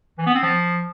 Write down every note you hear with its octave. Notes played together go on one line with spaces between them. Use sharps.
E3
B3
C4
F3